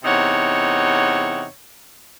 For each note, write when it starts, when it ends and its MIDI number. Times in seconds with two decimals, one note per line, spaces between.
0.04 1.45 40
0.04 1.45 48
0.04 1.45 63
0.04 1.45 73
0.04 1.45 78